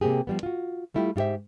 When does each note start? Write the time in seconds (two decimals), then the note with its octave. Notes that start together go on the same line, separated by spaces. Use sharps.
0.01 C3 A#3 C4 G4 G#4
0.27 F3 G3 B3
0.43 F4 F#4
0.94 G3 A3 E4 F4 G4
1.16 G#2 F4 G4 C5 E5